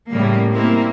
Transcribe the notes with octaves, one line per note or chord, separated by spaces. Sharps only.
A2 C#3 G3 A#3
G3 A#3 C4 E4